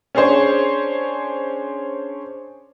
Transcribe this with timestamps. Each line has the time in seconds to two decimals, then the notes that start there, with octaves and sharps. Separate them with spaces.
0.15 C#4 D4 G#4 C5 C#5